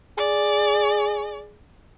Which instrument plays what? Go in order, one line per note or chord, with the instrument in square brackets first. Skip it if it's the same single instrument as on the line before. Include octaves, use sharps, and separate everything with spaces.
[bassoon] G#4 [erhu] D5